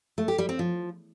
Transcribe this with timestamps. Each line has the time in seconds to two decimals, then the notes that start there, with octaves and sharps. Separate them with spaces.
0.18 A3
0.28 G4
0.38 G3
0.49 C4
0.59 F3